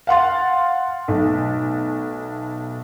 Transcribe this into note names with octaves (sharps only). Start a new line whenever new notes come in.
F5 F#5 C6 A6
B1 A3